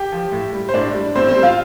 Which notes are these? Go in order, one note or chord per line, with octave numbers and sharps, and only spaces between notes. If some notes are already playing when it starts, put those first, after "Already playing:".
Already playing: G4 G5
F3
A2
G3
C5
A2 D4 D5
G3
A2 C4 C5
C4 C5
G3
F4 F5